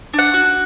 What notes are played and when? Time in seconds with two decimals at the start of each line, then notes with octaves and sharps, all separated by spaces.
0.14 D4 F#5
0.34 F#4